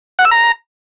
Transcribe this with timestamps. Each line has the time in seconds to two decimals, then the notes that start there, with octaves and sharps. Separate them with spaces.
0.19 F#5
0.25 E6
0.31 A#5